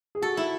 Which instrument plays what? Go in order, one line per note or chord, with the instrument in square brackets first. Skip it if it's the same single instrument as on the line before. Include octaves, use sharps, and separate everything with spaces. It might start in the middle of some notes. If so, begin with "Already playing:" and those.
[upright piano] G#4
[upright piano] F#4 [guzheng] A4
[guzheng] E4